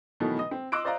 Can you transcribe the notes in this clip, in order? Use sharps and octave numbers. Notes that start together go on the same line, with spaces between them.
B2 D#3 E3 F#3 A3 B3
D#5 D#6
C4
D#5 C6 D6 E6 F#6 D7
C5 D5 D#5 F5 A#5